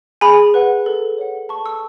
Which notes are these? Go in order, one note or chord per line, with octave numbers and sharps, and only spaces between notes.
G#4 G#5 B5
B4 F#5
A4
C#5 F#5
A4 A5 C#6
C#6 E6